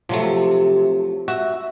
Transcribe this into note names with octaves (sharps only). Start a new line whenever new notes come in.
C3 F3 F#3 A3
F#4 E5